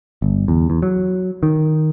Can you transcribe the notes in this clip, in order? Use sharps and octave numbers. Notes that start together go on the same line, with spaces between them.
G1
E2
E2
F#3
D#3